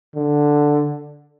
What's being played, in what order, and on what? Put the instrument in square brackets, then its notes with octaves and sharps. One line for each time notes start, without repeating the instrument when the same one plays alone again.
[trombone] D3